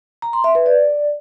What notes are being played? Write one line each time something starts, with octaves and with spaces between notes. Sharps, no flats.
A#5
C6
E5
B4
D5